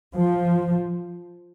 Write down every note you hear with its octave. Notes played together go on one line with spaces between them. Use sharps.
F3